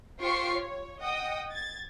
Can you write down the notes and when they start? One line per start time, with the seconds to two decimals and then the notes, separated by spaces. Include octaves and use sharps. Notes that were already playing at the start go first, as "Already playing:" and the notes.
0.21 F4 G4 C5 C#6 C7 D7
0.53 C#5
1.01 D#5 F#5 G5 D#6
1.52 G#6 A6